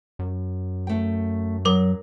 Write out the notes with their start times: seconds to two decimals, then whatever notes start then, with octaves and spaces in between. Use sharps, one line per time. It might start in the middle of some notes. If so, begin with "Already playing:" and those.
0.19 F#2
0.87 A3 G5
1.65 F#3 A#4 D6